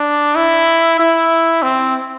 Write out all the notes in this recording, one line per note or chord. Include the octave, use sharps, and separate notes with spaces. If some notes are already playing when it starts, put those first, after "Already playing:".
Already playing: D4
E4
E4
C4